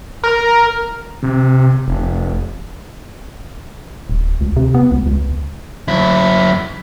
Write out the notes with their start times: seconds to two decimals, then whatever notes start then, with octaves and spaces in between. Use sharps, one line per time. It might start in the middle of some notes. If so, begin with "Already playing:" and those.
0.24 A#4
1.23 C3
1.88 F1
4.10 D1
4.41 C#2
4.56 C3
4.74 B3
4.92 C#2
5.06 C#2
5.88 F#2 E4